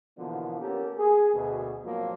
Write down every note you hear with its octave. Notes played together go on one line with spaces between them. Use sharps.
B2 D3 E3 F3 A#3 B3
A#3 B3 C#4 G4 A4 A#4
G#4
D2 B2
B1 F2 G#2 F3 F#3 A#3